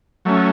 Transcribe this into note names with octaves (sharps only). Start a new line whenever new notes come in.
F#3 A3 C#4